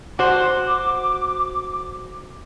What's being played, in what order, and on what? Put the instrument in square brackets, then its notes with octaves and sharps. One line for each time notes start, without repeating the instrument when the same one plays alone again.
[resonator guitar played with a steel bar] F#4 C5 [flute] D6